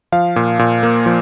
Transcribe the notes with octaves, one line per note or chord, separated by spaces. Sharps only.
F3 F5
A#2
A#2
A#3
F3